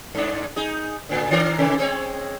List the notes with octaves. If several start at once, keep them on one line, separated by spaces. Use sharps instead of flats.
G2 D4
D#4 G#4
A2 D3
D#3 D4 A#4
C3 D#3 E3
G#3 C4 C#5